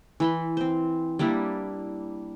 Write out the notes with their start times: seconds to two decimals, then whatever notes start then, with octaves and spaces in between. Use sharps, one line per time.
0.20 E3 B5 C6
0.57 C4 C5
1.19 G3 A#3 D4 E4